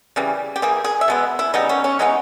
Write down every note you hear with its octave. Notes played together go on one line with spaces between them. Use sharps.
C#3 E3 G3
G4
E3 A#3 G#4
G#4
E5
B2 G#3 B3
E4
C#3 G3 B3 D#4
C#4
C#4
E3 G#3 B3 D#4